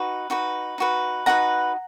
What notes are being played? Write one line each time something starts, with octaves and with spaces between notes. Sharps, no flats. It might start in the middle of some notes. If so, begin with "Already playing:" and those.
Already playing: D#4 F#4 B4
D#4 F#4 B4
D#4 F#4 B4
D#4 F#4 B4 F#5 A#5